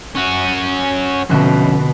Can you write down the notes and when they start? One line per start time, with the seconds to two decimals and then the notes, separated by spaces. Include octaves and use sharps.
0.16 C#4 F#4
1.29 F1 B2 D3 F3 C#4 E5 F#6